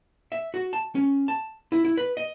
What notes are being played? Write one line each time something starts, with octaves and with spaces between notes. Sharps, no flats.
E5
F#4
A5
C#4
A5
E4
E4
B4
D#5